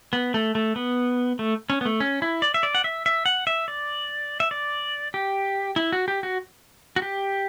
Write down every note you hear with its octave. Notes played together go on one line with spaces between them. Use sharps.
B3
A3
A3
B3
A3
C#4
B3
A3
C#4
E4
D5
E5
D5
F#5
E5
E5
F#5
E5
D5
E5
D5
G4
E4
F#4
G4
F#4
F#4
G4